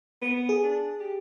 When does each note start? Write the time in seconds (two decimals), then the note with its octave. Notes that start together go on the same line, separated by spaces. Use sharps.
0.22 B3
0.49 G#4
0.62 D4
1.00 G4